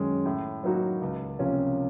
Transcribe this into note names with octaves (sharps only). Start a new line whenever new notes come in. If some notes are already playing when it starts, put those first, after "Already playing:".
Already playing: F#2 D#3 G#3 C#4
A2
F#3 A#3 D#4 F#4
C#2
C3 F3 A#3 C#4